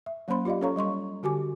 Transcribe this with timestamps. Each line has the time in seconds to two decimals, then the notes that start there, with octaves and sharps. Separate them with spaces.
0.06 E5
0.28 F#3 A#3 C#4 C5 B5 C6
0.45 F4 G4 D5 D#5 F5
0.61 C#4 A4 C#5 F5 A#5 C#6
0.76 G3 D#5 C6 C#6
1.23 D3 F#4 G4 G#5 D6